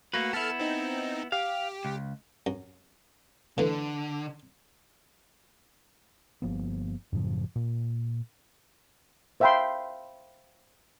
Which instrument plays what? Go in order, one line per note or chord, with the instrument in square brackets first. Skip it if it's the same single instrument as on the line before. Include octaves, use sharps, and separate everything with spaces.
[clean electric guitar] A3 A#3 B4 [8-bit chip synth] F#4
[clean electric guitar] B3 E4 [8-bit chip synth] A4 A5 F6
[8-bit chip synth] C4 D#4
[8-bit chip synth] G4 [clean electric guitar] F5
[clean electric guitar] C#2
[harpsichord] F#2
[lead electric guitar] D3 [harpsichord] E3 A3
[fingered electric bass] G1 F3 A#3 B3
F#2 A2 C#3 F3
A#2
[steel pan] C5 E5 F5 G5 B5 C6